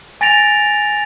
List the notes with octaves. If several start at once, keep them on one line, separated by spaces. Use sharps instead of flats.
G#5 A6 A#6 D7 F7